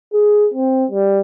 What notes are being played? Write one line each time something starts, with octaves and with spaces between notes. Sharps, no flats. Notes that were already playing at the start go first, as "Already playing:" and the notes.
G#4
C4
G3